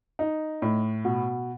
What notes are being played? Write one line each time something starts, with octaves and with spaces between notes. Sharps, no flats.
D#4
A2
B2